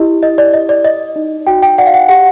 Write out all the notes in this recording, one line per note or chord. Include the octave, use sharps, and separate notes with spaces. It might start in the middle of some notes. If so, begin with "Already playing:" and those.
Already playing: E4 G4 D#5
E4 D#5
D5
D5 D#5
D5
D5 D#5
D#4
F#4 G5
G5
D5 F#5
F5
F#5
G4 F#5